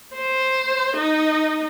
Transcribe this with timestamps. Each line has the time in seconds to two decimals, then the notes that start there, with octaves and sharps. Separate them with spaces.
0.15 C5
0.97 D#4